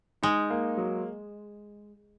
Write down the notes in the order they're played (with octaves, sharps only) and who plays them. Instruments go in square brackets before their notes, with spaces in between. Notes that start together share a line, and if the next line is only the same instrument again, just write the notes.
[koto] G#3 [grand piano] D#4
[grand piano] A#3
F#3